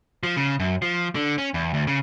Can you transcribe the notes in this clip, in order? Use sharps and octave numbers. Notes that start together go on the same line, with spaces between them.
F3
C#3
F#2
F3
D3
C#4
E2
D2
C#3